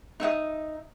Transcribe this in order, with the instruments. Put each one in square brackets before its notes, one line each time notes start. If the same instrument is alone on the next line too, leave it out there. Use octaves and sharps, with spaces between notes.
[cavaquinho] D#4 E5 F#5 D#6